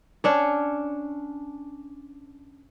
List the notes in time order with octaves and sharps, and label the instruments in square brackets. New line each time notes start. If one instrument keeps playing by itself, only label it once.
[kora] C#4 D4 C#5